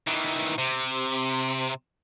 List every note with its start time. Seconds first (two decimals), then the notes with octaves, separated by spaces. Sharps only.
0.07 D#3 E3
0.58 C3